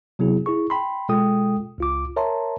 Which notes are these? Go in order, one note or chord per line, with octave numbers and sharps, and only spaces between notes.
C3 F#3 B3 E4 G#4
E4 G#4 C#6
G5 B5 C6
B2 G#3 F4 A4 G5 D#6
C#2 F4 D6
A#4 C#5 E5 A5 A#5 C6